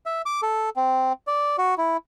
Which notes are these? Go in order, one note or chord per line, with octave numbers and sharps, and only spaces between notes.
E5
D6
A4
C4
D5
F#4
E4